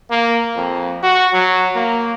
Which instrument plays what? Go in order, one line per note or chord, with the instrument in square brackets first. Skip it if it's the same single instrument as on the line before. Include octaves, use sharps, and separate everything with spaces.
[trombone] A#3
F2
F#4
F#3
A#3